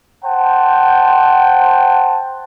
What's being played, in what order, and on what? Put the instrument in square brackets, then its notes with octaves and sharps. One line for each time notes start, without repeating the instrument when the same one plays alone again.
[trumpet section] C5 F#5 G5 A5